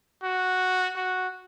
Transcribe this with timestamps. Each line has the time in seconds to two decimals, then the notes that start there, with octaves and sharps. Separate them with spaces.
0.23 F#4
0.96 F#4